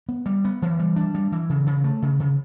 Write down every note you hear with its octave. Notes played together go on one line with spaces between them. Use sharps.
B3
G3
B3
E3
G3
D4
G3
E3
C#3
C#3
A3
C#3
C#3